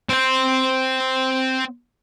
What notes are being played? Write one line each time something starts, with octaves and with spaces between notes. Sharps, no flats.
C4 C5